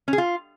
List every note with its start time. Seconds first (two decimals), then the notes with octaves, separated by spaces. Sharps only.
0.08 C#4
0.13 G#4
0.18 F4